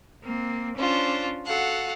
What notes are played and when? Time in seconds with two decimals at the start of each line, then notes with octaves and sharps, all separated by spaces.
0.23 A#3 C4
0.77 C#4 D4 F4 C5
1.46 F#4 A4 F5 F#5